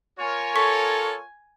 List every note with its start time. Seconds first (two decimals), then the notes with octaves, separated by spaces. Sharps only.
0.19 F4 A#4 C#5 G#5
0.56 A4 C#6 B6